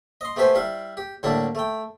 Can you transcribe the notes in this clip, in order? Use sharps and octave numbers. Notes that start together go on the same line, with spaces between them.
D#5 C6
A3 B3 G4 B4 C5 G#5
G3 E4 F5
G4
A2 D3 G3 A#3 D4 E4
A3 G5